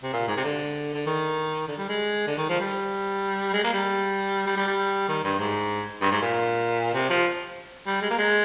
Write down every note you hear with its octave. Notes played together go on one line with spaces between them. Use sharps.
C3
A#2
G#2
C3
D3
D3
D#3
D3
G3
G#3
D3
D#3
F3
G3
G#3
A#3
G3
G3
G3
G3
D#3
G2
G#2
G2
G#2
A#2
C3
F3
G3
G#3
A#3
G#3